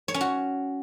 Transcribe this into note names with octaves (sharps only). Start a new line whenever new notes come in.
C#5
C#4
F#4